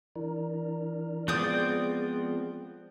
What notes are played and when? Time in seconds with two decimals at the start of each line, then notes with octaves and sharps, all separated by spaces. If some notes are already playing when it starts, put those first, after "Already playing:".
0.15 E3 D4 A#4
1.28 F3 G#3 B3 C4 D5 D#6 G6